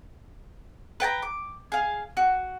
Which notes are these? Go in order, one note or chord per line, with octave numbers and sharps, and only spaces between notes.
B4 G5 A5 A#5
D6
G#4 F5
F#4